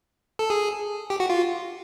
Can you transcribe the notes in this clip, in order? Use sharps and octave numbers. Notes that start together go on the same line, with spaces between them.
A4
G#4
G4
F#4
F4